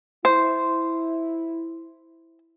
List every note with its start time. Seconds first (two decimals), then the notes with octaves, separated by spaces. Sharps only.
0.25 E4 C5